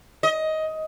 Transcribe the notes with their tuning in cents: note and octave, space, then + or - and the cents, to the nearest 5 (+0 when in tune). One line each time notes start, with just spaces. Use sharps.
D#5 +15